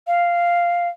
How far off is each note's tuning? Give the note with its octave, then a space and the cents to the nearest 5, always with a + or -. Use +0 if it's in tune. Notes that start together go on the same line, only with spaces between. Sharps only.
F5 -5